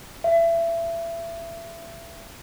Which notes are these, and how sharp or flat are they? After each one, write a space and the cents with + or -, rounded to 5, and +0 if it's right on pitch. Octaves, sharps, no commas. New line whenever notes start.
E5 +25